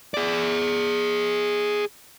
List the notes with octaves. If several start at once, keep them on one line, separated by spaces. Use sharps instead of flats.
G#4 D5